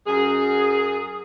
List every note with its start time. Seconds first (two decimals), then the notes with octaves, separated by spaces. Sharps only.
0.07 F#2 G#4